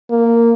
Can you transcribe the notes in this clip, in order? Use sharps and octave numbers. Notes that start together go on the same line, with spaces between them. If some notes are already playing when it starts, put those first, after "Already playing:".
A#3